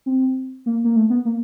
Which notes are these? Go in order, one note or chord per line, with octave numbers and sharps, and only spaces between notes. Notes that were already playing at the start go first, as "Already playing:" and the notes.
C4
A#3
A#3
A3
B3
A#3